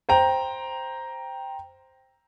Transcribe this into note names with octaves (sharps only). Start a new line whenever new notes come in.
C5 G5 A#5